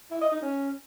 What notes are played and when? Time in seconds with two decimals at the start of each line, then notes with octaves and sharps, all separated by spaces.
0.11 E4
0.21 D#5
0.32 D#4
0.42 C#4